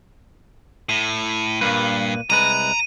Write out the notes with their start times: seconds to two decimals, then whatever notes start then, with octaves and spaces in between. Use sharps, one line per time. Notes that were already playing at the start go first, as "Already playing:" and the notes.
0.89 A2 D#7
1.61 G2 A#2 A#3 B4
2.30 C2 G#3 B4 A#5 D#7